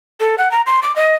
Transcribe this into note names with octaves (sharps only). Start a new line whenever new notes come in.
A4
F#5
A#5
C6
D6
D#5